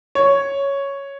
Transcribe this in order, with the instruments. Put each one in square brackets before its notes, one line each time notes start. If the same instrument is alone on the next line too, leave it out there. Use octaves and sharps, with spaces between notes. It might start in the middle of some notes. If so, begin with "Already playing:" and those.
[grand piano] C#5